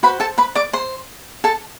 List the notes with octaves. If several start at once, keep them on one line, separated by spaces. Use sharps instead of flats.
F#4 B4 C5 B5
A4 A5
B4 B5
D5 D6
C5 C6
A4 A5